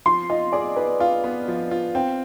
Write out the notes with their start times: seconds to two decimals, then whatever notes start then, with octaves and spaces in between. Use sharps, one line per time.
0.06 F3 C6
0.30 F4 D#5
0.53 G#4 D5
0.76 G#4 B4
1.00 F4 F5
1.24 B3
1.48 F3
1.71 F4
1.95 C4 G5